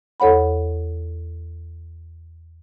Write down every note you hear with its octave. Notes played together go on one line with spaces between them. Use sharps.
E2 A4 C#5 F#5 B5